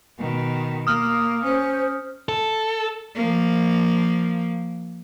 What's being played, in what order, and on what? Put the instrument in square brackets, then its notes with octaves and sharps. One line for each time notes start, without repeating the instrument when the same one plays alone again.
[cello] B2 D#3
[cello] A#3 [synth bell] D#6 F6
[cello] C#4 [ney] C5
[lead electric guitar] A4
[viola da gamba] F3 A#3